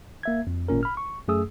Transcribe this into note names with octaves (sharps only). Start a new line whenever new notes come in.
A#3 E5 G#6
F2
G#1 A#2 C#4 A#4
B5 F6
C#6
F#2 A3 G#4 D#6 E6